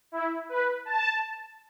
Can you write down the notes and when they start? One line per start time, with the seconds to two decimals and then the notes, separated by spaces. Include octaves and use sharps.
0.12 E4
0.49 B4
0.85 A5